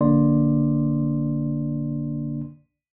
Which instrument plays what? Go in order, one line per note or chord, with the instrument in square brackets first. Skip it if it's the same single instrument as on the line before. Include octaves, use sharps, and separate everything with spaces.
[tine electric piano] A#1 D3 A#3 D4 D5 C6